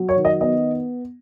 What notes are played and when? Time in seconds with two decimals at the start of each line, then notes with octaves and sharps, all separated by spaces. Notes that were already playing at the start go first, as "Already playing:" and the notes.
Already playing: F#3
0.09 C#5
0.16 D#3
0.25 D#5
0.41 B3 D#5